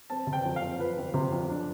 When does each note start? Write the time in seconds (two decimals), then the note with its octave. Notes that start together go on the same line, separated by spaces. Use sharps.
0.10 C4 A5
0.27 C3
0.33 G5
0.45 F2
0.56 F5
0.63 C4
0.79 F3 B4
0.98 F2
1.14 C3
1.32 F2
1.50 D4